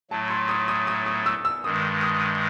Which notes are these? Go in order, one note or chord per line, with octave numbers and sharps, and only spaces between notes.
A2 F#3 A3 A5
C6
D#6
D#6
D#6
D#6
E6
E6
G2 D#3 G#3 D#6
D#6